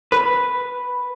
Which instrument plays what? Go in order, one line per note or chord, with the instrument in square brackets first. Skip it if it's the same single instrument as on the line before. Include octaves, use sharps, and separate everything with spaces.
[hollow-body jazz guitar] B4 [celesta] B5